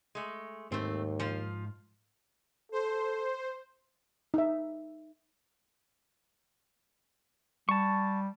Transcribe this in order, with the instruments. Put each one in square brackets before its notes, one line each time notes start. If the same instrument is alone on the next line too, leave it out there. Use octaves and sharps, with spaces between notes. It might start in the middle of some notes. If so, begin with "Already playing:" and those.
[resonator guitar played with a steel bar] G#3 A3
[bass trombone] D#2 [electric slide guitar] G#2 [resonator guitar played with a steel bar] A3 C4
[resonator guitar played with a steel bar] F3 F4
[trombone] A4 [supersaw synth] C5
[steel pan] D#4 E5
[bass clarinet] G3 [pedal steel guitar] A5 C#6